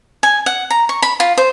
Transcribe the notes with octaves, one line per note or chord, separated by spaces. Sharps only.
G#5
F#5
A#5
C#6
B5
F4
C5